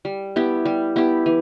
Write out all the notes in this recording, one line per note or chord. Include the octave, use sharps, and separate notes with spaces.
G3
B3 E4 G4
G3
B3 E4 G4
E3